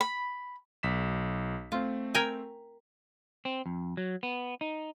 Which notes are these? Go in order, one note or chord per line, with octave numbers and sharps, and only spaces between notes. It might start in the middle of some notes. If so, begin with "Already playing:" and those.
B5
B1 B6 E7
A3 C4 F4
A#4 G5 G#5
C4
F2
F#3
B3
D#4